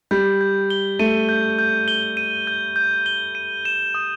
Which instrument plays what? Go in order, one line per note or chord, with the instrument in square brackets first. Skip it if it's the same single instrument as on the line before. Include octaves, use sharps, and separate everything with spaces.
[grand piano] G3 [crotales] G6
[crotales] G6
G7
[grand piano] A3 [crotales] D#7
[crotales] G6
G6
G7
D#7
G6
G6
G7
D#7
E7
D#6